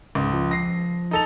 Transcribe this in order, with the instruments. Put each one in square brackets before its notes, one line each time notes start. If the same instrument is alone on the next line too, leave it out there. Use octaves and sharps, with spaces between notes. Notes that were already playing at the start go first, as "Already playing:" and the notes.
[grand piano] C#2 [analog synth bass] G#2
[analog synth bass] F3
[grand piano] A#6 C7
D#4 A4 F7